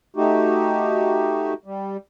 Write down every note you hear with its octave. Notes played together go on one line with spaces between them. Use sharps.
A3 D#4 F#4 G4
G3